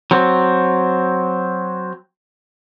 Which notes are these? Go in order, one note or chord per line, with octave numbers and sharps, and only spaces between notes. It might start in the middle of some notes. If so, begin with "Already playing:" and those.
F#3 C4